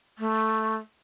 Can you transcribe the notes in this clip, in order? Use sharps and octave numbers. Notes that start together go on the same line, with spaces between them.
A3